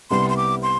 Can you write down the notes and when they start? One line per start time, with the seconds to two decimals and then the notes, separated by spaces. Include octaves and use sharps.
0.10 C2 C3 G3 B3 C6
0.30 C6
0.37 D6
0.63 C6